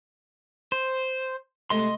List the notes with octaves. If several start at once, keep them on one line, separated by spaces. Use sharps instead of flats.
C5
C3 G#3 A3 D#5 C6